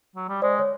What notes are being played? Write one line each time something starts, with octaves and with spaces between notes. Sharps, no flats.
F#3
G3
G#3 C5 D5
C#5